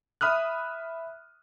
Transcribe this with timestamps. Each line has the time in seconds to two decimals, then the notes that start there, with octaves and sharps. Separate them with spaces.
0.21 E5 B5 D#6 F6 F#6